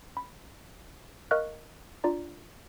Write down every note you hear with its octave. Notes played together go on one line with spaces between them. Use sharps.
B5
A#4 D#5 F5 C#6 F6 F#6
D4 F4 D5 A#5